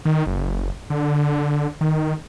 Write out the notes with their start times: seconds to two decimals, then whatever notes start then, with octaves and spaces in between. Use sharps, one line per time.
0.05 D#3
0.26 F#1
0.90 D3
1.81 D#3